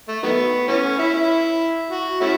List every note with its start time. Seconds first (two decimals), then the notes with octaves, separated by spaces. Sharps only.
0.08 A3
0.23 D#3 F#3 B3
0.68 E3 A3 C#4
0.99 E4
1.14 E4
1.90 F#4
2.21 A3 C#4 E4